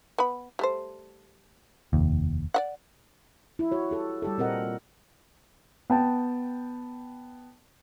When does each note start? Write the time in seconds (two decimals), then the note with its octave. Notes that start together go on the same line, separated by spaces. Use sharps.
0.18 B3 B5
0.59 G3 A3 C5
1.93 F1 D#2
2.54 D5 E5 F#5
3.59 E4
3.71 F#4 C#5
3.91 G4 A4
4.22 G3 G4 A4
4.38 A#2 C4 A#4 D#5 F#5
5.90 B3 G5 A5